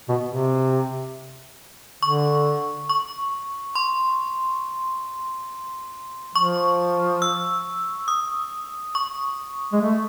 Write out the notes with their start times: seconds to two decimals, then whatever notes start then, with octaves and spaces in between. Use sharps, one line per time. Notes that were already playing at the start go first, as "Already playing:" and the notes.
0.09 B2
0.30 C3
2.03 D3 C#6
2.89 C#6
3.75 C6
6.35 F3 C#6
7.22 E6
8.08 D#6
8.95 C#6
9.73 G#3
9.81 A3